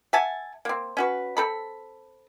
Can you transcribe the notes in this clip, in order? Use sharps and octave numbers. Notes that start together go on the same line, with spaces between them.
E5 F#5 G#5 A5
A#3 C4
C#4 F#4 B4
C4 A4 B5